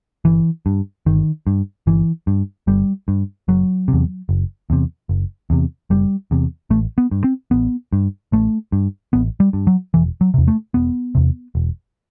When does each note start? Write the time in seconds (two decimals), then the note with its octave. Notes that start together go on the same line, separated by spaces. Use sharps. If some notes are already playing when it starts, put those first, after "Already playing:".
0.25 G1 E3
0.66 G2
1.06 G1 D#3
1.47 G2
1.87 G1 E3
2.27 G2
2.67 G1 G3
3.08 G2
3.48 F#1 F#3
3.88 C3
3.93 E2
4.29 F#1
4.70 E2 C3
5.09 F#1
5.50 E2 C3
5.90 F#1 G3
6.31 E2 C3
6.70 A1 A3
6.98 B3
7.11 G2
7.24 C4
7.51 A1 B3
7.92 G2
8.32 A1 A3
8.72 G2
9.13 A1 B3
9.40 G3
9.53 G2
9.67 F#3
9.94 E1 E3
10.21 F#3
10.34 E2 C3
10.48 A3
10.74 E1 B3
11.15 E2 C3
11.55 E1